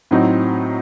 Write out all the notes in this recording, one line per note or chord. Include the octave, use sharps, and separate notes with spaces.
A2 F#3 C4 D#4